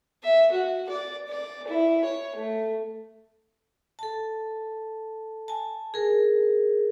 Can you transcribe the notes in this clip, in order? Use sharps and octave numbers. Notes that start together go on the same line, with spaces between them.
E5
F#4
D5
D5
E4
C#5
A3
A4 A5
G#5 A5
G#4 A#4